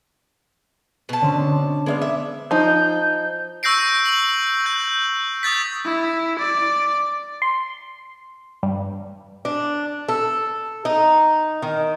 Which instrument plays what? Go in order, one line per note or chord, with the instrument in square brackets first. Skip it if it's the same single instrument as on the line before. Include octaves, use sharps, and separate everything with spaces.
[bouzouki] B2 A5
[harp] D3 C4 C#4
C4 D4
[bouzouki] G#3 E5 F5 [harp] B3 D5
[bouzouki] E5
[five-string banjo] F3 D#4 [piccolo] G6
[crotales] C#6 E6 G6 A#6 C7 D7
F#7
G6
D#6 G6 A6 B6
[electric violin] E4
D5
[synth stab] C6
G2
[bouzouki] D4
A4
D#4
D#3